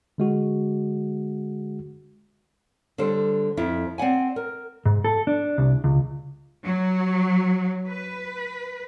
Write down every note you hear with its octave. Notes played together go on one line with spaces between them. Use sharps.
D3 G#3 F#4
D3 G3 A4 C5
F2 E4
C4 D5 F#5 G#5
A#4
G#2
A4
D4
C2
C#2
F#3
B4